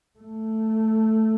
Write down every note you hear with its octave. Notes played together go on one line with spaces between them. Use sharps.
A3